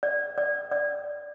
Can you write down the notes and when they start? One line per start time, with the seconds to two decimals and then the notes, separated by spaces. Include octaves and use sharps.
0.03 D5
0.38 D5
0.72 D5